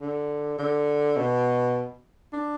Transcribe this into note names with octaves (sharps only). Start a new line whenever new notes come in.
D3
D3
B2
D4